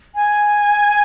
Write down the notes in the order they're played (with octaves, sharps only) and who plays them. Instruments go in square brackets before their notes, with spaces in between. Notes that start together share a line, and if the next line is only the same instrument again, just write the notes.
[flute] G#5